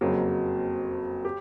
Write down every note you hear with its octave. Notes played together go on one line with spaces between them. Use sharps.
F#1 F2 C#3 F#3 A#3
G4